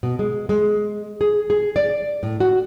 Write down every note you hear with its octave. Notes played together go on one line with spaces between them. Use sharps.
B2
G#3
G#3
G#4
G#4
D5
A2
F#4